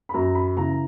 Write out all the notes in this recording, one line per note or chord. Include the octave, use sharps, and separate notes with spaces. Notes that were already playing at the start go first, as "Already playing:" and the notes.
B5
F#2 A#5
B5
C#3 E3 A#5